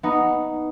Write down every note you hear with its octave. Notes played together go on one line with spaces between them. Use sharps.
B3 D#4